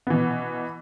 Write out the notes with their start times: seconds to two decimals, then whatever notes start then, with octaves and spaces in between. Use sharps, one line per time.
0.07 B3
0.10 E3
0.14 B2